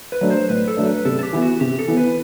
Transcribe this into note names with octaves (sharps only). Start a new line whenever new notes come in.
B4
F#3 A3 D4
C5
A2 B4
A4
F#3 A3 D4
B4
C3 A4
A4
G4
E3 B3 E4
F#4
C3 G4
A4
E3 B3 E4
B4